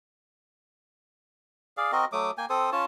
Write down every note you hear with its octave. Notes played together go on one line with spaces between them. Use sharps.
G#4 D5 F5
C4 F#4 A#4 D#5
F#3 A3 D6 D#6
A#3 G5 G#5
C4 A4 C5 D#6
C#4 F4 C#5 A5